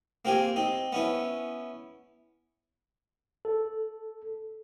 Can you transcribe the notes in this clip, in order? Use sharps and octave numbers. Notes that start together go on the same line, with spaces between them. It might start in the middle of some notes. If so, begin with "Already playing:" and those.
A#3 C4 F4 G4 G#5
C4 D#4
B3 C#4 E4
A4